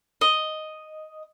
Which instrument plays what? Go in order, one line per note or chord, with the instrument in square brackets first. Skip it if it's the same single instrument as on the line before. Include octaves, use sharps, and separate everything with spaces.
[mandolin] D#5